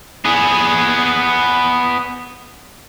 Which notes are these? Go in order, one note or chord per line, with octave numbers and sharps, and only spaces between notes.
B3 G#4